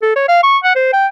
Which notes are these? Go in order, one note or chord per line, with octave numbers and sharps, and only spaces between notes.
A4
C#5
F5
C#6
F#5
C5
G5